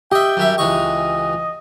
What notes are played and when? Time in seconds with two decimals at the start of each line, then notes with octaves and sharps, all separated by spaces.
0.12 G4 D#5 E5 G5
0.37 F#2 G3 E5
0.58 C#2 E3 D#5 C#6